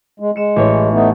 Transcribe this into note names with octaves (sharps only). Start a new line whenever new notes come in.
G#3
G#3 C#7 E7
A1 C#5
A3 B3 D#4